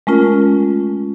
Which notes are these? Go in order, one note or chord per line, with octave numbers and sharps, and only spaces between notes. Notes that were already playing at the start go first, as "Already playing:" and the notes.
G#3 A3 C#4 F4 A#4